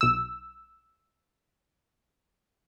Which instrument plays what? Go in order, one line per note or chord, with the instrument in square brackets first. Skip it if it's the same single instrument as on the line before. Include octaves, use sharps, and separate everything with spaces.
[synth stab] B1 E6